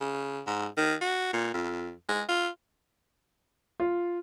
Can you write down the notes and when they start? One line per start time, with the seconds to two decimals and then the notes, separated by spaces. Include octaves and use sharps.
0.01 C#3
0.47 G#2
0.77 D#3
1.02 F#4
1.33 A#2
1.54 F2
2.09 G#3
2.29 F4
3.80 F4